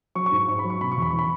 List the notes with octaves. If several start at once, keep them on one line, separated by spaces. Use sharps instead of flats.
F#3 C#6
C#6
G#2
G#2 C#6
B5
F#3
C#6
B2 B5
C#6
E2
B5
E3 C#6
B5